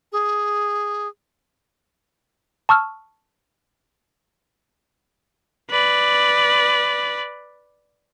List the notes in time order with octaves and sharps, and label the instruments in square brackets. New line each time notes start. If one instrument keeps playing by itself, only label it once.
[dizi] G#4
[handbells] A5 C#6 E6 F6
[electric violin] B4 D5